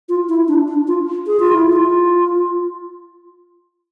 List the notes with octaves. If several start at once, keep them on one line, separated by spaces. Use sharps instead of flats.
F4
E4
D4
D4
F4
G#4
F4
E4
F4